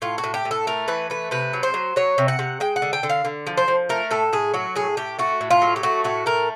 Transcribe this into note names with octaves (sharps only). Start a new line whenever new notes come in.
A2 F4
F#4
A2
G4
A2
A4
A3 A#4
E3 B4
A3 B4
C3 B4
F#3
C5
F#3
F#3 C#5
C3
F#5
C3
G#3 G5
F#5
D3
G5
D3
F5
D3
F3
C5
F3
A3 A#4
A2 A4
A2 G#4
F#3 F#4
A2 G#4
A2 G4
A3 F#4
A2
F4
F#3
G4
A3 F#4
A2 F#4
A3 A#4